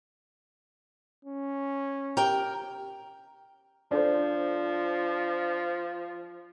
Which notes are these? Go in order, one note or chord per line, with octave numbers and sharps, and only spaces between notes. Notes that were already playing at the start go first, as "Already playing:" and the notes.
C#4
G4 A#4 G5
F3 D4 A4 C5